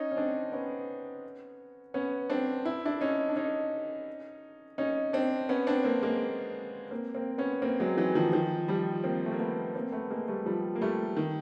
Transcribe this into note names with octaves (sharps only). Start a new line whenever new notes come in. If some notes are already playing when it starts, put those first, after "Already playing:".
Already playing: C#4 D#4
C#4
C4 D4
B3 C#4
B3 C#4
C4 D4
E4
D4 E4
C#4 D#4
D4
C#4 D#4
C#4 D#4
C4 D4
B3 C#4
C4 D4
A#3 C4
G#3 A#3
A#3 C4
A#3 C4
B3 C#4
A#3 C4
F#3 G#3
E3 F#3
D#3 F3
D#3 F3
F3 G3
A#3 C4
A3
A#3
A3 B3
A#3 C4
A3 B3
G#3 A#3
G3 A3
F3 G3
A#3
G3 A3
D#3